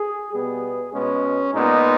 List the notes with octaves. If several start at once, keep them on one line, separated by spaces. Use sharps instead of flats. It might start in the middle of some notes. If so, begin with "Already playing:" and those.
Already playing: G#4
B2 G3 B3 G#4
B2 G#3 B3 C#4
A#2 G#3 B3 D#4